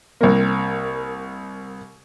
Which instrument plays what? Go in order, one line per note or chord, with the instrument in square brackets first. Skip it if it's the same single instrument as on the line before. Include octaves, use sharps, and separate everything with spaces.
[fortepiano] C2 A#3